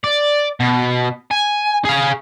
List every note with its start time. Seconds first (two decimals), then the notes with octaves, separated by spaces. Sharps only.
0.04 D5
0.60 B2
1.31 G#5
1.85 G#4 F5